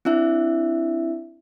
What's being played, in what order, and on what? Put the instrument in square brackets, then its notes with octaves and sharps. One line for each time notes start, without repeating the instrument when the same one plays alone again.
[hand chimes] C4 D4 E4 E5